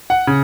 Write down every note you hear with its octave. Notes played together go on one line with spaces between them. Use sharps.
F#5
C#3